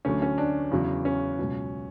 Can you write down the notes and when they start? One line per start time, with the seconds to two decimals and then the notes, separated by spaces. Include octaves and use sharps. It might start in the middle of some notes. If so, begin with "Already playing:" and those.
0.05 D2 D3 F#3 C#4
0.22 C#4
0.38 D4
0.71 E2 C#3 F#3
1.05 C#4
1.39 C#2 B2 F#3